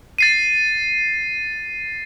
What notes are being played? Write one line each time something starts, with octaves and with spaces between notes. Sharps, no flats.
A6 C7 D#7